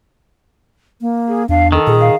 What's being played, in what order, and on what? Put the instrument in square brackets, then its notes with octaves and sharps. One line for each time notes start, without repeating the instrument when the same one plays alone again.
[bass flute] A#3
[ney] G#4
[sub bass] E2 [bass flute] D4 [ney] F5
[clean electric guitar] D#3 [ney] A4
[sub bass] A#2 [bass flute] G#4
[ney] F5